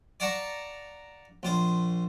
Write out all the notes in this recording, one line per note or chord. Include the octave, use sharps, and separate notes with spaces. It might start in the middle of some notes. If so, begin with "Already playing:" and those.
D5 F5 F#5 A5 A#5 C#6
A#1 F4 C5